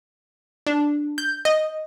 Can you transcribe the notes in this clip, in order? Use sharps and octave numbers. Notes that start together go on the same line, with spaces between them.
D4
G6
D#5